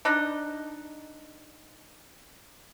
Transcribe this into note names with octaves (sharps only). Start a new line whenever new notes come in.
D4 D#4 D#5